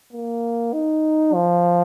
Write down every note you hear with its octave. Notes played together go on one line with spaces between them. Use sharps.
A#3
D#4
F3